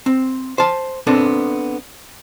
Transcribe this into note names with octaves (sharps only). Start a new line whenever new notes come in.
C4
C5 A5
B3 C4 D4 A4